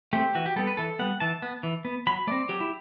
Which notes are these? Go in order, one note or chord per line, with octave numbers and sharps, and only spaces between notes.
A3 C4 G4
E3 F#4
G4
G3 B3 A4
B4
E3 A4
G3 B3 F#5
E3 A5
B3
E3
B3
F#3 B5
A3 C4 D5
F#3 G4
E4